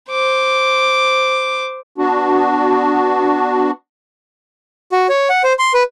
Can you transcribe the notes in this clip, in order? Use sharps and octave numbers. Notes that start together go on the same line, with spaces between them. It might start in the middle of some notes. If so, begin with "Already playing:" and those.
C5 D6
B3 D4 F#4
F#4
C#5
F#5
C5
C6
B4